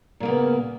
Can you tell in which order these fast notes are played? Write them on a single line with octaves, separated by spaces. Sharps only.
A#2 A#3 C#3 B3